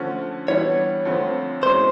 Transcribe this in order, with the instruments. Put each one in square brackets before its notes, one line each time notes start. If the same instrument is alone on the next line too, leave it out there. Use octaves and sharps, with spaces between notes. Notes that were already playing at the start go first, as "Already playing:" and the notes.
Already playing: [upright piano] D3 F3 A3 C#4
[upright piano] E3 G3 B3 D4 [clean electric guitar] C#5
[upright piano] F2 D3 F3 A3 C4
[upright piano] B2 G#3 C#4 E4 [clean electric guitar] C5